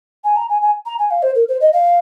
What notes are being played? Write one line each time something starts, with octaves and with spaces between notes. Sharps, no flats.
G#5
A#5
G#5
G#5
A#5
G#5
F5
C5
A#4
C5
D#5
F5